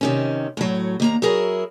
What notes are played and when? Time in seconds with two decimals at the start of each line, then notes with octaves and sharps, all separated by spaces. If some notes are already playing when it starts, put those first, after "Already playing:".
0.01 C3 D#3 C#4
0.57 A2 F#3
1.00 D#2 A#3 A#5
1.22 F#3 E4 G#4 A#4